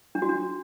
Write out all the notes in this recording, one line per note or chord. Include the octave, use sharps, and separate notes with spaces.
D4
F#4
D4